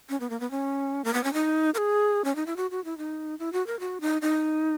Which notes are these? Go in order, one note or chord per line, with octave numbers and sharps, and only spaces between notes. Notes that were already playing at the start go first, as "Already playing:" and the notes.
C#4
B3
A#3
B3
C#4
A#3
B3
C#4
D#4
A#4
G#4
C#4
D#4
E4
F#4
F#4
E4
D#4
E4
F#4
A#4
F#4
D#4
D#4